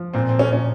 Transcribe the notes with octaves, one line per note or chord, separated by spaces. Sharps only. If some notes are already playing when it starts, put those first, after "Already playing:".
Already playing: F3
A#2 C4
C4
C#4
A#2 C#4